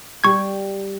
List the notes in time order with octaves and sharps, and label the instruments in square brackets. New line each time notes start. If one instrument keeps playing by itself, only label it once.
[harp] G3 G4 [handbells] C#6 G#6